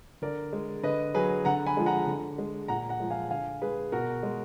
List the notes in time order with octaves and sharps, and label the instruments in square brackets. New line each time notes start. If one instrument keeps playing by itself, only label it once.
[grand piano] D3 A#4 D5
G#3
D3 B4 D#5
F#3 G#4 B4
D3 F#5 A#5
G#5 B5
F3 G#3
F#5 A#5
D3
G#3
A#2 F#5 A#5
F#5 A#5
F3 G#3
F5 G#5
D3 F5 G#5
G#3 G#4 B4
B2 F#4 A#4
G#3